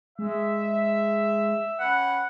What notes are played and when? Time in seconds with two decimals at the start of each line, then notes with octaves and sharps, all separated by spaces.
0.19 G#3 E5
1.80 C#4 B4 F#5 G5